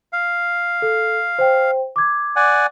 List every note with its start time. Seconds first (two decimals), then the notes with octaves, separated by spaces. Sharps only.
0.13 F5
0.82 A4
1.39 C5 G5
1.96 D6 G#6
2.36 D5 F#5 G#5